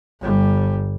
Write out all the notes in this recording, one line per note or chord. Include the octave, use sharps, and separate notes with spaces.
G1 G3